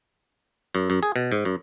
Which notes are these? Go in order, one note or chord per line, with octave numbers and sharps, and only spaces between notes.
F#2
F#2
G#4
B2
G#2
F#2